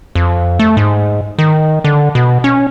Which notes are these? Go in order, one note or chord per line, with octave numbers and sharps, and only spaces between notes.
F2
A3
G#2
D#3
D3
B2
C#4